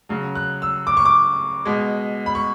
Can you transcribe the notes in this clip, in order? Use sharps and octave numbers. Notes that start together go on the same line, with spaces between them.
C#3 F#3
F#6
E6
D6
C#6
D6
B2 G#3
B5
C#6